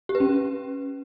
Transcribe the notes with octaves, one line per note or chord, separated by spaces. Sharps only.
G4
B4
C#4